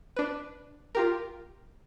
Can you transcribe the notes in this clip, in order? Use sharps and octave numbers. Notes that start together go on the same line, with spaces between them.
D4 B4
F4 G4 A#4